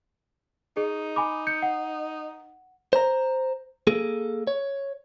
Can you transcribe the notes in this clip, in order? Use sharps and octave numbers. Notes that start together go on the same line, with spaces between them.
D#4 G#4
G#5 B5 D6
G6 C#7
F#5
C5 A#5
A#3 G#4 A4
C#5